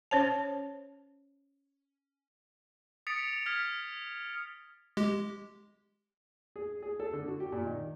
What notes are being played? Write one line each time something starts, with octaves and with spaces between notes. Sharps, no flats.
C#4 C5 C#5 A5
D#6 A6 B6 C#7 D7 F7
F6 G#6 B6
G#3 G4
G#4
G#4
A4
D3
F#4
G4
A#2
D#3